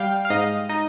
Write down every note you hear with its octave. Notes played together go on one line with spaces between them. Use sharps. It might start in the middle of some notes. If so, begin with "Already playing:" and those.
Already playing: G3 F5 G5
F5
G#2 D#5
D#4 D#5